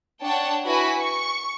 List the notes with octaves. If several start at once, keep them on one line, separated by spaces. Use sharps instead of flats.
D4 C#5 F#5 G5 A5
E4 F#4 B4 G#5 B5 B6
C#6